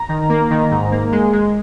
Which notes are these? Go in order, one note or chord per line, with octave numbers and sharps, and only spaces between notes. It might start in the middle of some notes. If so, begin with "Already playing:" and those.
Already playing: A#5
D#3
A#3
D#3
G#2
A#3
G#3
G#3